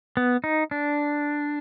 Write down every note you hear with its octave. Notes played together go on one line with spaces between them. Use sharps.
B3
D#4
D4